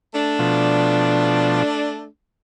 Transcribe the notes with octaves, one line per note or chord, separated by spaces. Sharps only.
A3 D4
B2 F3